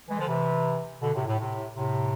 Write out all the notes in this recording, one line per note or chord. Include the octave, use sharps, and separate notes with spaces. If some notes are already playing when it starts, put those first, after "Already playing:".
E3 G#3
D3 F3
C3 E3
B2 D3
A2 C3
A2
A2 C3
A2 C3